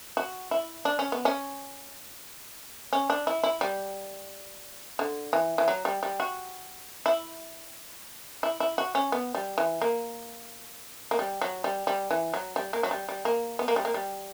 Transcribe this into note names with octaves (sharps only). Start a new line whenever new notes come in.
F#4
E4
D4
C#4
B3
C#4
C#4
D4
E4
E4
G3
D3
E3
E3
F#3
G3
G3
F#4
E4
E4
E4
F#4
C#4
B3
G3
E3
A#3
A#3
G3
F#3
G3
G3
E3
F#3
G3
A#3
F#3
G3
G3
A#3
B3
A#3
G3
A#3
G3